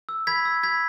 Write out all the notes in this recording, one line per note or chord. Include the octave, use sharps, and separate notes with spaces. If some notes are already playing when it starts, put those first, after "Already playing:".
E6
B5 G#6 B6
E6
B5 G#6 B6